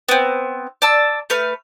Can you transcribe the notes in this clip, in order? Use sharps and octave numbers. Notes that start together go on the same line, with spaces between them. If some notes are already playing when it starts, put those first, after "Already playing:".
B3 C4
D5 A5 E6
A3 B4 F6